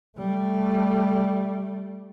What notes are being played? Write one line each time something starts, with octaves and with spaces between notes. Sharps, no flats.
G3 A3